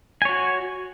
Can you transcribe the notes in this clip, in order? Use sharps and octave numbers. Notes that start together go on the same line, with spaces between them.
F#4 C#5 G#5